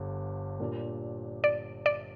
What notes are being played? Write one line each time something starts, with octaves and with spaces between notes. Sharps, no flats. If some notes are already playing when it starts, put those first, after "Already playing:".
Already playing: G1 G2 D3
A#2 G3 D4 F4 A#4
D5
D5